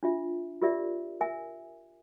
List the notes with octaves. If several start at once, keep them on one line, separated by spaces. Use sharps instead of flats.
D4 F4 E5
F4 G4 A#4 D5 E5
A#4 E5 G#5